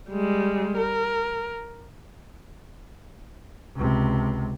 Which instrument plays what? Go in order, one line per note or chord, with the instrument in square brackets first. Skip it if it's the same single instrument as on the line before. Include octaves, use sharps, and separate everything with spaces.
[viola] G3 G#3
A#4
[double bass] C#2 C3